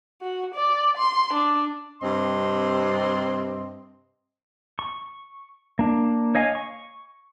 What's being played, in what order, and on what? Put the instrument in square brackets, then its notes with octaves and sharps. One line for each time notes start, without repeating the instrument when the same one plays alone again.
[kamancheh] F#4
D5
C6
D4
[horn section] G2 C3 C4 D#5 C6
[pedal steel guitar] C#6
A#3 D4
C#5 D#5 F5 G#5
C#6